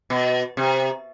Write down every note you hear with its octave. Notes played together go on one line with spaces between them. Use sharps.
B2
C3